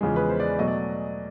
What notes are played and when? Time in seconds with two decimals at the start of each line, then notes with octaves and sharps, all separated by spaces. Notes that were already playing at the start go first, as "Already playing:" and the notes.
0.01 E2 C#3 F3 G#3
0.16 B4
0.30 C5
0.40 D5
0.59 B2 F#3 A3 D#5
0.68 D5